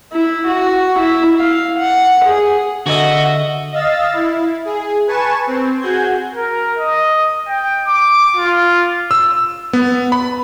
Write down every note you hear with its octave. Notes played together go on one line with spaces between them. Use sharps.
E4
F#4
E4
F5
F#5
G#4
D3 F#4 D#5 E5 E6
D#5 F5 E6 A6
E4
G#4
B4 G#5 A5 C#6 E7
C4
F#4 G#4 G6 G#6
A#4
D#5
G5
D6
F4
E6
B3
B5